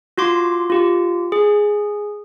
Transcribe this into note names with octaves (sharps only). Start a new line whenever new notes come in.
F4 F#4 C6 D6
F4 G4
G#4